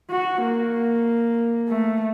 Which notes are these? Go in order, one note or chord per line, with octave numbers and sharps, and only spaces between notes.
F#4
A#3
A3